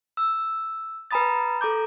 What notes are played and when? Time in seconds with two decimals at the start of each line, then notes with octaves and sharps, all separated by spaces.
0.17 E6
1.11 B4 G#5 A#5 B5 D#6 A6
1.61 A4 A#5 D6 G6